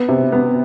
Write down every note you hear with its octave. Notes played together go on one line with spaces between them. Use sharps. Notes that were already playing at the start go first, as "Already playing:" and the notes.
Already playing: B3
C3
B3